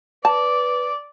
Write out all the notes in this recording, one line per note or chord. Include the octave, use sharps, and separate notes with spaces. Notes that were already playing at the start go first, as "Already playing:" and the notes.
B4 D5 A5